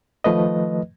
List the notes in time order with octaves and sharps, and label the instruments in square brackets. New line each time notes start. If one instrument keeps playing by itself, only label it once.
[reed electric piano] D#3 F3 A3 B4 D#5